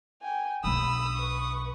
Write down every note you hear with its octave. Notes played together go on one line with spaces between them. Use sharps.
G5 G#5
B1 D4 B5 D#6 E6
B4 C#6